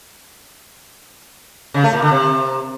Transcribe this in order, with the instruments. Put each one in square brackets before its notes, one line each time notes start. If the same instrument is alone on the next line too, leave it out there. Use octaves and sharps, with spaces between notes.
[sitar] C#3
A3
A#2
D3
C3